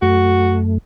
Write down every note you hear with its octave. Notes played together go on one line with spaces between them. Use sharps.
F#2 A3 F#4